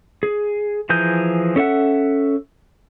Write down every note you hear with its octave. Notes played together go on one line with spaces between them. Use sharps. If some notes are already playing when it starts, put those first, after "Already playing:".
G#4
E3 F3 G#4 A#4 G6
C#4 A4 E5 F#5